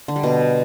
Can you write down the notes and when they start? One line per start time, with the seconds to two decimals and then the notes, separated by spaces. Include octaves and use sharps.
0.08 D3
0.16 G3
0.23 B2